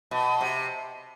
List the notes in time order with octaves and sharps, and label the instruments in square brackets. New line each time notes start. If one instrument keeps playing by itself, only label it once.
[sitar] B2
C3